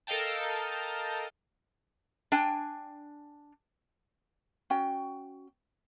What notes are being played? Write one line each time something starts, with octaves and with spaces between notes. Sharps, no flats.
A4 A#4 D#5 F5 G5 A5
D4 G5 G#5
C#4 F#4 G5